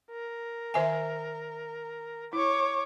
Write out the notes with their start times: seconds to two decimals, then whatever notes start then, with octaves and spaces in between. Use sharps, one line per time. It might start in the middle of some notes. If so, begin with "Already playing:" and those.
0.11 A#4
0.74 D#3 E5 G#5
2.33 E4 C#5 D6